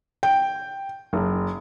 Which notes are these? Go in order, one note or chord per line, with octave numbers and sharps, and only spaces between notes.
G5
F#1